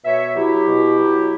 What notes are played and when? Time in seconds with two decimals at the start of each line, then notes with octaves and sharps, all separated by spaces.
0.05 B2 C#5 E5
0.36 F#3 E4 G4
0.68 B2
0.99 F#3